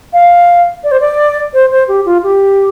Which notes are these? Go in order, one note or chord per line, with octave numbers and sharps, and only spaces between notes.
F5
D5
C5
D5
C5
C5
G4
F4
G4